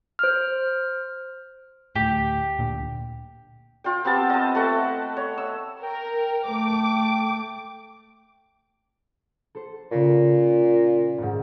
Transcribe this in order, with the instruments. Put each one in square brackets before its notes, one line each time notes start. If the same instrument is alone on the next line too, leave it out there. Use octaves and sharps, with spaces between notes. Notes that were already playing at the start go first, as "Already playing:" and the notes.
[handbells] C5 F6
[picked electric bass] D2 A2 [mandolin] G4
[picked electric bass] D2 A#2 D3
[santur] F4 G5
B3 C4 G4 A5
D#5 A5
A3 F#5 G5
C#5
E6
[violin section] A#4 [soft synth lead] G5
[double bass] A3 [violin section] D6
[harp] A4 C5
[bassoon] A#2 [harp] C#3 C#6
[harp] G#1 G#2